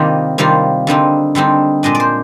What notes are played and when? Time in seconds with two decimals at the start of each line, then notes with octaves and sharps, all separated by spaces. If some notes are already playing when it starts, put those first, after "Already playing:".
Already playing: C3 D#3 G3 A#3 C4 F4 D#5 F5
0.38 C3 D#3 G3 A#3 F4 F5
0.87 D3 G3 C4 D#4
1.35 D3 G3 C4 D#4
1.83 A#2 G#3 D4 D#5
1.95 D5
2.00 C5